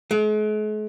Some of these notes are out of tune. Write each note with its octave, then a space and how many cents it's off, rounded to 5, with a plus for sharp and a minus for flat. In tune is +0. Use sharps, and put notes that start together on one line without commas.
G#3 +45